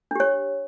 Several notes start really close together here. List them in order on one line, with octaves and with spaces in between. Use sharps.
D4 G4 C#5